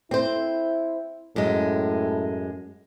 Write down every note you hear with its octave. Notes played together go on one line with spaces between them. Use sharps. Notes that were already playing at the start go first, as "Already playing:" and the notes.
C4 E4 C5
F#2 A2 G#3